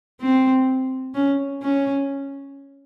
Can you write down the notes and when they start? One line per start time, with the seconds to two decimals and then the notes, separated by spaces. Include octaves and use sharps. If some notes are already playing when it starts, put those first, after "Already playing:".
0.21 C4
1.14 C#4
1.62 C#4